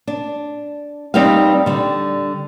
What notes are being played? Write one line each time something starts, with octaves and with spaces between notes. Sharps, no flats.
D4
G3 C4 D#4 G4 B4 F5
D3 G3